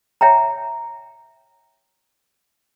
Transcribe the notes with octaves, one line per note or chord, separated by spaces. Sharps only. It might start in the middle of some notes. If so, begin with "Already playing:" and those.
C#5 E5 G5 A#5